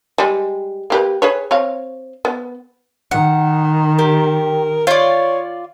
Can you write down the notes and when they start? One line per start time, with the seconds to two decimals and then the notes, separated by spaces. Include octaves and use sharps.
0.18 G3 G#3
0.90 A#3 G4 B4
1.22 G#4 B4 C#5
1.51 C4 C#5 F5
2.25 B3
3.11 D#3 F#5
3.99 G4 A#4
4.87 F4 C#5 D5